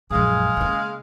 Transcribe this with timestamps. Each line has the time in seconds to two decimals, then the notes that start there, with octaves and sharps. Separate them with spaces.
0.10 A#1 F#2 G#3 G#4 F5
0.57 C#3 A#3